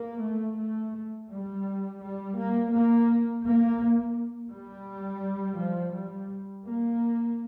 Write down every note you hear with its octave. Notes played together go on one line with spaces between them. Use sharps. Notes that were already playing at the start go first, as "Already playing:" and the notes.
Already playing: A#3
A3
A3
G3
G3
A#3
A#3
A#3
G3
F3
G3
A#3